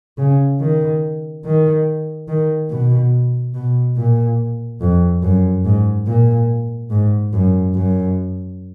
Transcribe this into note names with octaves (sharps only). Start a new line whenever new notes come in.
C#3
D#3
D#3
D#3
B2
B2
A#2
F2
F#2
G#2
A#2
G#2
F#2
F#2